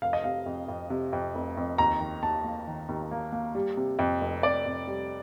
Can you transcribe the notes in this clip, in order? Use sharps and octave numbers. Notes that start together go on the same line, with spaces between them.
F1 F5
D#5
C3 F5
F2
F2
C3
F2
F1
F2
D#2 A#5
D#3
D#2 A5
A#3
D#3
D#2
A#3
A#3
G3
C3
F2
F1
F2 D5
F2
G3